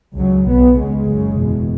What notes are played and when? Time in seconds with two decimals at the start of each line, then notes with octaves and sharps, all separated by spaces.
0.17 C#2 C#3 F#3
0.47 B1 B2 B3
0.77 C#2 C#3 G#3
1.08 F#1 F#2 C#3
1.38 F#1 E2 B2